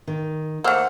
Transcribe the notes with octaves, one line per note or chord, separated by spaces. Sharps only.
D#3
A3 A#3 C5 F#5 E6 F6